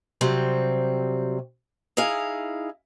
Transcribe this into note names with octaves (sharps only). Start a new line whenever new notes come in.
C3 F#3 G3 C4
D#4 E4 G#4 F5